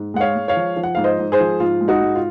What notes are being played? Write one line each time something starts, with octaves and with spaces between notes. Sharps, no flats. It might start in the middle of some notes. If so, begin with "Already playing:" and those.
Already playing: G#2
G#3 F#5
C#5 F5
G#3
C#5 F5
F3
F3
F#5
G#2 F5
C5 D#5
G#2
G#4 C5
F3
G#2 F4
G#3
D#4 F#4
G#2
F4